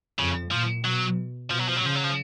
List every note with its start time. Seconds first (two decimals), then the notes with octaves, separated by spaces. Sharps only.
0.19 F2 C#3
0.52 A#2 F3
0.85 B2 F#3
1.51 B2 F3
1.59 F#3
1.68 F3
1.77 F#3
1.83 C#3 F3
1.95 F#3
2.04 F3